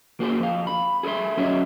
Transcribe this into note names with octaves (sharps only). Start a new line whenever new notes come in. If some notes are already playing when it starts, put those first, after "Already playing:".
A#3 F#4 G#4 C5
F2 F5
B5
G#4 A4 D5 E5 C6
F#3 C#4 F#4 C#5 D#5 E5